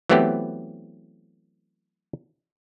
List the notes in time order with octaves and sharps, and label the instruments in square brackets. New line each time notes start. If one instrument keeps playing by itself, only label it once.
[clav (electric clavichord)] E3 F#3 A3 B3 C4 G4